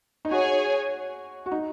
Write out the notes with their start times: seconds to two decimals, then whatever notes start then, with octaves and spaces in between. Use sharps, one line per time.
0.25 D#4
0.31 F#4 G#4 C#5 G#5
1.46 F#4
1.51 D#4